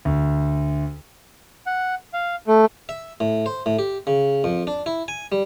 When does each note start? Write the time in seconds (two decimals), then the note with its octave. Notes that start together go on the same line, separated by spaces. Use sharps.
0.05 D2
1.66 F#5
2.13 F5
2.47 A3
2.89 E5
3.20 A2
3.46 C5
3.66 A2
3.79 G4
4.07 C#3
4.44 F2
4.67 D4
4.86 E4
5.08 G#5
5.32 G3